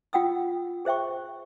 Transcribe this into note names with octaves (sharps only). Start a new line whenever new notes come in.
F4 F#5 G5 D#6 E6
G#4 C5 E5 G5 C#6